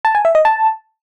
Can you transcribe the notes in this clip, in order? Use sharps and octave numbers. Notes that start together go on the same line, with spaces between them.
A5
G#5
E5
D#5
A5